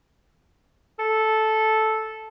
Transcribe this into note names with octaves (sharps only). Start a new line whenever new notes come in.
A4